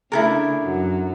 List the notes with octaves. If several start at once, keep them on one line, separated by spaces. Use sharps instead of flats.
C#3 A3 D4 E4 A4 A#4
F#2 F#3